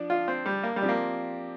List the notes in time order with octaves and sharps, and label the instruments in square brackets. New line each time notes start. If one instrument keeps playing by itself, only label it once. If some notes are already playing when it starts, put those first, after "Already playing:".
Already playing: [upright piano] F3 D4 D5
[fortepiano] F4
C4
G3
A#3
G3
[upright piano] F3 C4 G4 D5
[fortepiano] A#3